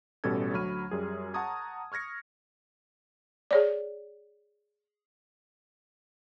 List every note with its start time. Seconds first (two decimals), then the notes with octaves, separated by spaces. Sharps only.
0.24 A1 B2 G3 C#4 A4 G#6
0.53 D2 F#3 B5 C#6 F6 D#7
0.91 F#2 G3 G#4
1.34 F#5 A5 A#5 C#6 D#6 G#6
1.92 C#6 F6 G#6 A#6 C#7
3.51 G#4 C#5 D5